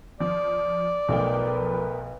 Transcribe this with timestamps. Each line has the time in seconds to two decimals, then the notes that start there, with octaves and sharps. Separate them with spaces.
0.20 F3 D5
1.09 B1 F3 A3 A#4 B4 G5